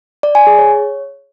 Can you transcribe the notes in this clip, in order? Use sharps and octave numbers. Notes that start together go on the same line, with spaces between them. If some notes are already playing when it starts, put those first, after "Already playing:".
D5
G#5
G#4
C#5